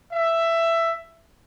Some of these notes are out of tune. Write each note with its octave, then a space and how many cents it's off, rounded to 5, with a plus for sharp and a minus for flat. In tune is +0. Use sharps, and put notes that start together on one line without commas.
E5 +10